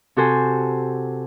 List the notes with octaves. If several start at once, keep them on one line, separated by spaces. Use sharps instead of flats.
C3 F#4 A4 C5 G#5